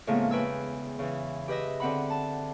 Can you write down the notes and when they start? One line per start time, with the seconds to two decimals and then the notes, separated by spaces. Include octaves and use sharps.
0.07 A2 C#3 F3 G#3 A#3 B3
0.31 E2 B4 G5 G#5 E6
0.99 C#3 E3
1.48 G4 B4 D#5 E5
1.80 D3 C4 F#5 B5
2.10 A5